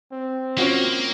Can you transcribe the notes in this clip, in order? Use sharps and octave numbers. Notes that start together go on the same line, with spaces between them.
C4
A#3 C#4 F4 F#4